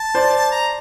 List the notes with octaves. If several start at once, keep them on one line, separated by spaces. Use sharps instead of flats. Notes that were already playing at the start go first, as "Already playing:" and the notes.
Already playing: A5
C5 D5
A#5